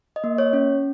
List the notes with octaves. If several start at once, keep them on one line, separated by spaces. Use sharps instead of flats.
D#5
A#3
C#5
C#4